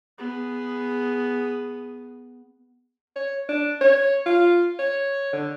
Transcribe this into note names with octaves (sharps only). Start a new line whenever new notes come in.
B3 G#4
C#5
D4
C#5
F4
C#5
D3